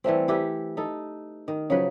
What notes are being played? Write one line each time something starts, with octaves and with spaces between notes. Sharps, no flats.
E3 G3 A3 C4
E4 G4 A4 B4
D#4 A4
D#3
C#3 F3 F#3 B4